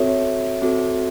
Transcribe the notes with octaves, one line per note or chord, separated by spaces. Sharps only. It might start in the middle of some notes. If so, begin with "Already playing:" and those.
Already playing: C4 F#4 A4 C#5 E5
C4 F#4 A4